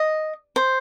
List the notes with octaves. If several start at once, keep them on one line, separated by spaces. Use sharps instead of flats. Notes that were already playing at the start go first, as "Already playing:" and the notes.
Already playing: D#5
C5